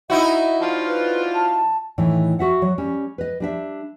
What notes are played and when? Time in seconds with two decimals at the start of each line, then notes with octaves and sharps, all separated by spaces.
0.10 D#4 E4 F#4 E5
0.62 F3 D4 F4
0.87 B4
1.35 A5
1.98 A2 D#3 E3
2.39 F#4 E5 F#5
2.62 F#3
2.78 G3 C#4
3.18 B4 D#5
3.40 G3 D4 E5